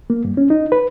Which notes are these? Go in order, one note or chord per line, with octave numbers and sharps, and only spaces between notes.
A#3
G2
C#4
D#4
B4